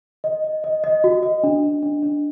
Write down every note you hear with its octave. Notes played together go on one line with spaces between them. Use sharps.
D#5
D#5
D#5
D#5
F#4
D#5
D4
D4
D4
D4